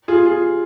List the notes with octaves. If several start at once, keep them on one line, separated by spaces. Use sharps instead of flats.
F4 G#4
F4 G#4